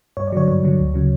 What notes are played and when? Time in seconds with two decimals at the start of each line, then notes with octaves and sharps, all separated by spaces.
0.17 G2 C#5
0.27 D5
0.32 D3 F#3 C#5
0.48 G2 C#5
0.63 D3 F#3
0.79 D2
0.94 C#3 F#3